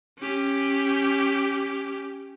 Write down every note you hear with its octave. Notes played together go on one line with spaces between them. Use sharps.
C#4 G4